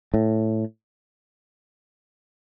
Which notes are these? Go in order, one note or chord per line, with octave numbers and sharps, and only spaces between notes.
A2